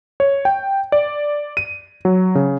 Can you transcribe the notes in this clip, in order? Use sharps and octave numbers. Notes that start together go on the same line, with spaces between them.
C#5
G5
D5
D#7
F#3
C#3